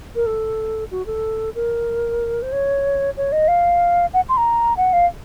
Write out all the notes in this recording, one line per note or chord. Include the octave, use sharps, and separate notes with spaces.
A#4
A4
F#4
A4
A#4
C5
C#5
C#5
D#5
F5
F#5
C6
A#5
F#5
F5